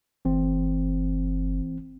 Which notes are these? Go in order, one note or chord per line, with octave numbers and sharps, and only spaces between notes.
F#1 E3 C4